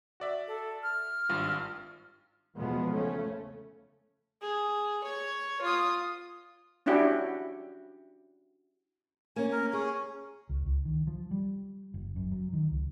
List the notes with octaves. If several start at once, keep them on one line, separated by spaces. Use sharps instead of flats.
F#4 D5 E5
A4
F6
G#1 G2 F4
E2 B2 F3 G#3 B3
C#3 A3 C#4
G#4
C#5
F4 D#6
C#4 D4 E4 F#4 G4
A#3 C#4 G#5
A#4
C#4 G#4
C#2
C#2
D#3
F3
G3
F#1
F#2
F#3
D#3
C#2